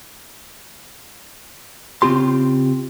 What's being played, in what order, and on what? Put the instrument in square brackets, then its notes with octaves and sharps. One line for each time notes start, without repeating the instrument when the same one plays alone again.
[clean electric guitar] C#3 C4 F4 G4 C6